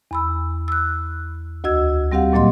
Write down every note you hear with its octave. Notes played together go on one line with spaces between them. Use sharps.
E2 B5 E6
E6 F#6
D2 F#4 D#5 E6 G#6
G3 C4 G4 F5 F#5
D#2 A#2 F#3 A#3 D#5 C6